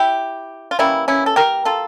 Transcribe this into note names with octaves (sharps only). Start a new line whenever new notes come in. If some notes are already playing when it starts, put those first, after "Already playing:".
Already playing: E4 G4
F4
E3 G3 A#3 C#4 E4
C#4 E4
A4
G4 A#4
F4 A4